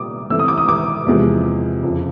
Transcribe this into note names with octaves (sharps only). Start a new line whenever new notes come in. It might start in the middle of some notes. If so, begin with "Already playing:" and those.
Already playing: A#2 G3 D6 D#6
E3 A3 C4 E6
D#6
D6
D#6
D6
E2 C3 F3 G#3
F2 C#3 F3